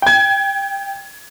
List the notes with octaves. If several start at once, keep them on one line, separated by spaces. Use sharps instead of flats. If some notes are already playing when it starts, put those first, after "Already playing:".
G5 G#6